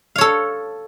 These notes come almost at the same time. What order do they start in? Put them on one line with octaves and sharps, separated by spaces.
F5 C#5 A4